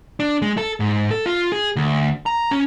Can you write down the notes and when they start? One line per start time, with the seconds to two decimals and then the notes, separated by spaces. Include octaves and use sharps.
0.20 D4
0.42 G#3
0.58 A4
0.80 G#2
1.11 A4
1.26 F4
1.52 G#4
1.76 D2
2.26 A#5
2.51 C#4